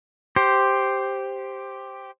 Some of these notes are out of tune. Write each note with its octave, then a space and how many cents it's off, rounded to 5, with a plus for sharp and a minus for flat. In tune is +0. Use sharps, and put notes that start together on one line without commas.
G4 +0 C5 +0